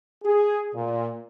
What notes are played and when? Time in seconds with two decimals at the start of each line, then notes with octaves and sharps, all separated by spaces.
0.24 G#4
0.75 A#2